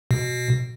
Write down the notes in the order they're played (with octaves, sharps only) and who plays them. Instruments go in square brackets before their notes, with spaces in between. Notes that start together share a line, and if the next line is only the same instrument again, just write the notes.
[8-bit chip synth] B2